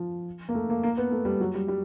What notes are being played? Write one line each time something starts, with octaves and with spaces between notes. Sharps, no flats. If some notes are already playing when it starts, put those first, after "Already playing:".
Already playing: F3
A#3
A3
A#3
A#3
B3
A3
G3
F#3
G3
G3